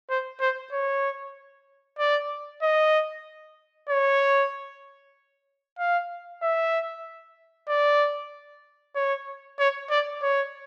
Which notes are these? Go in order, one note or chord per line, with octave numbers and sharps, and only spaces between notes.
C5
C5
C#5
D5
D#5
C#5
F5
E5
D5
C#5
C#5
D5
C#5